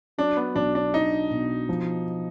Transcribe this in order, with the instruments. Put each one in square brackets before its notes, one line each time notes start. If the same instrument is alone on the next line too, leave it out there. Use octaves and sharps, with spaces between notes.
[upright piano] F#3 [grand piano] D4
[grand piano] B3
[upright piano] B1 [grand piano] D4
[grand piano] D4
[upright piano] D4 [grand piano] D#4
[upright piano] B2
F3